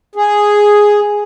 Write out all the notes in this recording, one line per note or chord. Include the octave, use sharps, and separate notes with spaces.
G#4